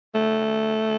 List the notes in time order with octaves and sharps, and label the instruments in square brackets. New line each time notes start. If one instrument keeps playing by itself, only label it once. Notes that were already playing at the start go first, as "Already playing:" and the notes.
[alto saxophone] A3